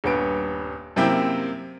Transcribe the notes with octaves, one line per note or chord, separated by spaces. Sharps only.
D#1 G2 B3 D7
F#2 C3 A#3 C4 E4 G5